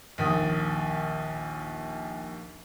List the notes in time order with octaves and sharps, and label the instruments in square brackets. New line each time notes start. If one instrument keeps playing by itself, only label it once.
[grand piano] A#1 D#2 D#6